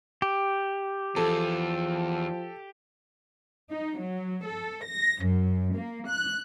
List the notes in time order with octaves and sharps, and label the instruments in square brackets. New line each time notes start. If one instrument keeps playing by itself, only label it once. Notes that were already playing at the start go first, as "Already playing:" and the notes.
[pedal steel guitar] G4
[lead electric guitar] E2 [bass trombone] F3 [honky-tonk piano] A4
[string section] D#4
F#3
A4
A#6
F#2
A#3
F#6